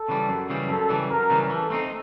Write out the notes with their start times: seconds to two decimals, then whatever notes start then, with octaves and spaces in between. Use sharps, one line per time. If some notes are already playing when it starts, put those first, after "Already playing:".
Already playing: A4
0.08 C#3 E3 G3
0.29 F#2
0.50 C#3 E3 G3
0.69 F#2 A4
0.89 C#3 E3 G3
1.10 F#2 A#4
1.30 C#3 E3 G3
1.50 E3 A4
1.70 A3 C4 D#4